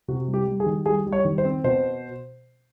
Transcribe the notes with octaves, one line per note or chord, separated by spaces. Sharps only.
C3 F#4
G3
G4
G3
G#4
D#3
G3 G#4
G3
C#5
D#3
C5
C4
B2 C5